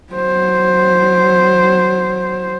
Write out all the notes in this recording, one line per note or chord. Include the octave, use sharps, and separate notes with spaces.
F#3 C5